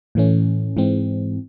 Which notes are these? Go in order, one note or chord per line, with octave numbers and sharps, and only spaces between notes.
A2 E3 A3 C#4
G#2 E3 G#3 C4